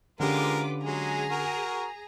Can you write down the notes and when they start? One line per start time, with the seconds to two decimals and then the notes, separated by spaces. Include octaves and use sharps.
0.20 D3 G#3 C#4 F4 G4 A#4 B4 D6
0.84 F#3 G#3 G#4 A#5
1.30 F#4 A#4